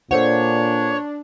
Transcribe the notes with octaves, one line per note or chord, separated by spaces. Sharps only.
A#2 D4 A4 C5 C#5 F#5